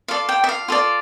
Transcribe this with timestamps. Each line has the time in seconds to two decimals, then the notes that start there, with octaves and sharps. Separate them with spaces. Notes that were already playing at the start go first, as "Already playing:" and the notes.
0.08 F4 A4 D5 F5
0.29 G5
0.44 E5
0.49 F5
0.68 F4 A4 D5